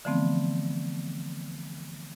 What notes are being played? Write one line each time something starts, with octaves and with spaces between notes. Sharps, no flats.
D3 E3 F3 A3 B3 C4